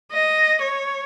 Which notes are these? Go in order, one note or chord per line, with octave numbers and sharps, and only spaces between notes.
D#5
C#5